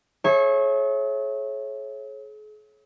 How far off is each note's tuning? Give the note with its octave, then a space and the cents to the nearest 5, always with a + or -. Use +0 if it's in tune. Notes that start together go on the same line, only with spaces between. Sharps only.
G#4 +45 C#5 -25 E5 +0